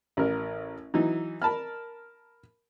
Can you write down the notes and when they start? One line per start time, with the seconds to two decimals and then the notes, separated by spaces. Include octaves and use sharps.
0.17 A1 A#4
0.94 E3 F#3 D#4
1.42 A#4 A5 B5 F6